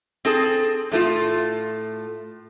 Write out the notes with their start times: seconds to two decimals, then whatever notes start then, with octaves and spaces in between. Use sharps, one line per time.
0.25 C4 G#4 A4
0.92 A2 A3 F4